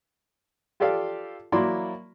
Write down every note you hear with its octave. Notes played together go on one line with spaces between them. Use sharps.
F4 G4 A4 D5 F5
F#3 A#3 E4 D5 B5 C6